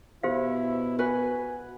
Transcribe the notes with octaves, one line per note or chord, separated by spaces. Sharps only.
B2 E4 G4 C5 F5
F#4 B4 G#5